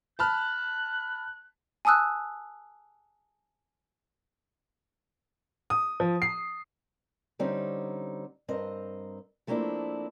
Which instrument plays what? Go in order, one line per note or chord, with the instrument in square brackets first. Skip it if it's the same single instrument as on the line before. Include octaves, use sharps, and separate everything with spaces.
[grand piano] A5 B5 F6 [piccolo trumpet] F#6
[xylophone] G#5 A5 D#6 E6 F#6
[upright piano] D#6
F3
C7
[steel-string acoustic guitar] D3 G3 C4 C#4 D#4
G2 C4 A#4 D#5
F3 A3 A#3 C4 D4 E4